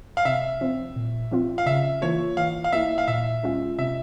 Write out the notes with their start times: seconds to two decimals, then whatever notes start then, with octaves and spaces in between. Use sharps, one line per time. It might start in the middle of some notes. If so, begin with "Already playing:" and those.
0.17 F5
0.25 C3 E5
0.61 F3 C4
0.96 A#2
1.32 F3 C4 F4
1.58 F5
1.66 C#3 E5
2.02 E3 A#3 F4 C#5
2.37 E3 F5
2.64 F5
2.72 A#3 E4 E5
2.98 F5
3.08 A#2 E5
3.43 G#3 C#4 F4
3.78 C3 E5